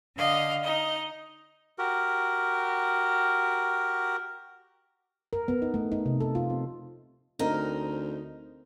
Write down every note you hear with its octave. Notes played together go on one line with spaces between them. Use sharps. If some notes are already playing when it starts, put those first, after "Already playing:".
D3 D#5 F5
D#4 D#5
F#4 G4 A#4
A#4
B3
D#4
A3
D#4
C3
A4
F4
C4
D2 C4 D#4 A#4